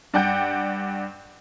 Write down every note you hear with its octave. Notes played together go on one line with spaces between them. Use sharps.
G2 D5 F#5 G5 G6